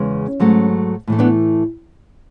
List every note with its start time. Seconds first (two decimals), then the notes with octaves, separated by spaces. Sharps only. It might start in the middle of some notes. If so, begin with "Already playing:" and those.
Already playing: E2 C#3 G#3 B3 C#4
0.40 G#2 F#3 A3
1.07 A2 E3 A3
1.19 B3 D4